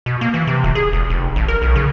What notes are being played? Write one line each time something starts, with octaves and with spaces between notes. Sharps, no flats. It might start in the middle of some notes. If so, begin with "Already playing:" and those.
B2
A#3
E3
C3
D#1
G#4
E1
F1
A1
A#4
B1
C#3